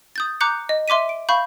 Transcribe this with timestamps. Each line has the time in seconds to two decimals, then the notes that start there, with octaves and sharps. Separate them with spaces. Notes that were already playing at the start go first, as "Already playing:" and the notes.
0.16 D#6 G6 A6
0.41 A#5 D6 F#6 G6 C#7
0.69 D#5
0.88 E5 C6 D6 B6 D#7
1.09 D7
1.29 F5 B5 C#6 G6